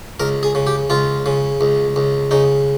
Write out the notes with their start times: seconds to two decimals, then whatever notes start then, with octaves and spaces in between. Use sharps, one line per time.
0.20 C#2 A#4
0.43 G#4
0.55 C#3
0.67 G4
0.90 C#2 F4
1.26 C#3
1.61 C#2
1.96 C#2
2.31 C#3 D#4